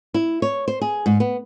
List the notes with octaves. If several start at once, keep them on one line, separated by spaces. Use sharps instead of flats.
E4
C#5
C5
G#4
G#2
B3